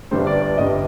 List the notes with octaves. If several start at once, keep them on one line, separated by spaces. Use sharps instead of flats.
G1 G2 D3 G3 C5
D5
D5
G1 G2 D3 G3 D#5